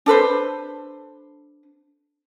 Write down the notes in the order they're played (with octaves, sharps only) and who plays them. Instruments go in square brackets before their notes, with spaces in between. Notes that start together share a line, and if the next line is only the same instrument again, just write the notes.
[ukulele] D4 A4 B4 C5